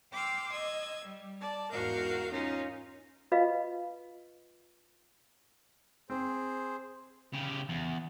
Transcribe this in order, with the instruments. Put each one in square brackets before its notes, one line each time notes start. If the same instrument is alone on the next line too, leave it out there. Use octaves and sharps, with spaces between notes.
[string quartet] G5 C6 D6 E6 F6
D#5 E6 G#6
G3
D5 A5
E2 G#2 F#4 A#4 F5 G6
C#4 D#4 F4
[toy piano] F4 B4 D#5 F5
[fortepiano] C4 [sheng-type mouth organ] G#4 C5
[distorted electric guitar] C#3 G4
E2